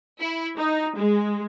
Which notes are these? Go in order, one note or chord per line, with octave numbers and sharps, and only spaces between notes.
E4
D#4
G#3